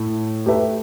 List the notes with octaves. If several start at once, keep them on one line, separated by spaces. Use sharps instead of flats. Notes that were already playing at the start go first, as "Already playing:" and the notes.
Already playing: A2 A3 E4
A3 G4 B4 E5